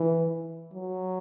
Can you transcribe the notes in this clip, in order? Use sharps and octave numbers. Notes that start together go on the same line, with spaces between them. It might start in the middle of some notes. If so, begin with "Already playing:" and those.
Already playing: E3
F#3